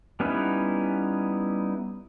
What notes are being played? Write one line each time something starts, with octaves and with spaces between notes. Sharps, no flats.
G3 B3 C#4 D#4 E4